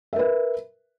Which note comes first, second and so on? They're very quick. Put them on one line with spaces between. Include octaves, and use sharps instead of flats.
E5 A#4 B4